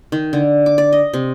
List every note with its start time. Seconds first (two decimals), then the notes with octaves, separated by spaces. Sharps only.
0.12 D#3
0.33 D3
0.66 D6
0.78 D5
0.93 D#5
1.14 C3